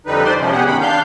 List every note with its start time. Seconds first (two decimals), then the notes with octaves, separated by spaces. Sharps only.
0.06 F2 D3 G3 D#4 B4
0.24 C5 D5 C6
0.39 C3 F3 G#3 C#4
0.51 B2 G4 G#4 F#5
0.66 F#2 D#3 B5
0.81 D4 F5 G6